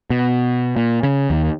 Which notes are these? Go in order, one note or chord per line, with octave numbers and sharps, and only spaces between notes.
B2
A#2
C#3
D#2